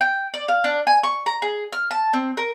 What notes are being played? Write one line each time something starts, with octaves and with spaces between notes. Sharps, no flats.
G5
D5
F5
D4
G#5
C#6
A#5
G#4
F6
A5
C4
A#4